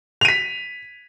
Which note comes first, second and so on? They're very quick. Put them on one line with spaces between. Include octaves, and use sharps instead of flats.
F7 D#7 B6